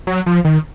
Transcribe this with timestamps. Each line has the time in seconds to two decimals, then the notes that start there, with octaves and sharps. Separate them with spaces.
0.07 F#3
0.26 F3
0.45 D#3